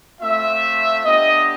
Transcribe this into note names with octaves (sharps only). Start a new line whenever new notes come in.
A3 C4 F4 E5
B3 D4 G4 D#5